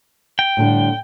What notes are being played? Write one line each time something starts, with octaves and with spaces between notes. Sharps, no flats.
G5
A2 D3 G3